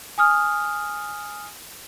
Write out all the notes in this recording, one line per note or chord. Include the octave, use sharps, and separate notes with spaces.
G#5 D#6 F6